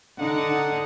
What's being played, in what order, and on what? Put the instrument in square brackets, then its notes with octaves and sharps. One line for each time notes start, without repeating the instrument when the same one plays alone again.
[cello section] D3 D#4 [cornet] F#5